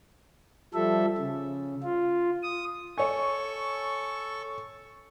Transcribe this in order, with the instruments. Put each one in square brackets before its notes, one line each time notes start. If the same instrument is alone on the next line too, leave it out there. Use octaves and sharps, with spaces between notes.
[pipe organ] F3 G3 A4 E5
C#3
F4
D#6
[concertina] A4 C#6 [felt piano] C#5 G#5